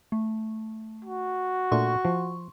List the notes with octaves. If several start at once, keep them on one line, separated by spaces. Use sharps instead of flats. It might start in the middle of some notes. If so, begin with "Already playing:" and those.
A3
F#4
A#2 A3 D4 C6 C#6
F3